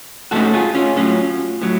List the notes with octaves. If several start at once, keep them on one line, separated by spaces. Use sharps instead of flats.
G#2 F#3 A3 C#4 F#4 A4
F4 G#4
C#4 F4
A2 F#3 C#4
A2 F#3